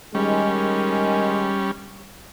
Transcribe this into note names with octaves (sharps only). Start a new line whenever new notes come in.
D#3 G3 G#3 C#4